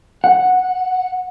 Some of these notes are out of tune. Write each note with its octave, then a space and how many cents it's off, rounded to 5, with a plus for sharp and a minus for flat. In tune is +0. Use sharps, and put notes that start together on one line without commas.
F#5 -10